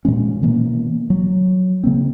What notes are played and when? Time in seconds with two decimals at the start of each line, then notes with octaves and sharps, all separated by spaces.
0.05 A#2 E3 G#3 C#4
0.42 B2 E3 A#3 B3
1.10 F#3
1.84 C#3 A#3 C4